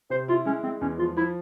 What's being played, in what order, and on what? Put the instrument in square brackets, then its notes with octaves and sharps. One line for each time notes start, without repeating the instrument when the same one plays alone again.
[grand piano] C3 [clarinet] C5
[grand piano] E4 [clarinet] F4
[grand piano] G#3 [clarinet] C#4
[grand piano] G#3 [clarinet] C4
[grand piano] E2 [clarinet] C#4
[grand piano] F3 [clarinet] F4
[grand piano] F3 [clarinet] E4